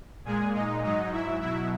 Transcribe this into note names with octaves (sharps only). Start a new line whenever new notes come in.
A#2 G#3 G#4 G#5
D#4 D#5
G#2 F#3 D#4 D#5
E4 E5
B2 F#3 E4 E5